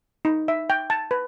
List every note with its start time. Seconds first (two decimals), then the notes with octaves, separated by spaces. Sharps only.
0.25 D#4
0.48 E5
0.70 G5
0.90 A5
1.11 B4